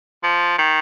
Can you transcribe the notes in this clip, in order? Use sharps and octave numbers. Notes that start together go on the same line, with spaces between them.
F3
D#3